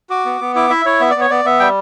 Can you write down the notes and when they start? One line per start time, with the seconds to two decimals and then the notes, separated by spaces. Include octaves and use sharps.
0.10 F#4 D6
0.25 B3
0.41 B3
0.55 E4 D6
0.70 E4 E5
0.86 E4 C#5
1.00 B3 E5
1.10 D5
1.16 B3 C#5
1.30 B3 D5
1.45 B3 E5
1.60 G3 G5